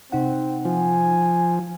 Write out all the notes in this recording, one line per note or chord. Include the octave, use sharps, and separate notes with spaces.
C3 C4 D#4 F#5
F3 G#5